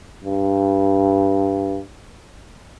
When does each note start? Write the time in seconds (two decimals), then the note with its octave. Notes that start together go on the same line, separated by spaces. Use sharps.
0.24 G2